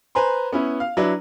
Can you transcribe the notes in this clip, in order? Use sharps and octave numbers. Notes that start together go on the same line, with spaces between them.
B4 C5 G#5 A#5 C6
B3 C#4 E4
F5
F#3 D4 E4 B4